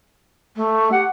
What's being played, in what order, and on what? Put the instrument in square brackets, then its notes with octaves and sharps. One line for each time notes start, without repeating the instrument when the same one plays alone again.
[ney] A3
[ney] G4 [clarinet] F#5